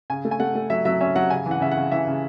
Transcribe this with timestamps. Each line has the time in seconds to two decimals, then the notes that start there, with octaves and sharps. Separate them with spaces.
0.10 C#3 G#5
0.25 A3
0.31 G#5
0.40 A3 F#5
0.55 A3
0.70 F#3 E5
0.85 F#3 E5
1.01 C#4 E5
1.16 F#3 F#5
1.30 C#3 G#5
1.46 E3
1.51 F#5
1.61 C#3 E5
1.71 F#5
1.77 C#3
1.91 E3 E5
2.07 C#3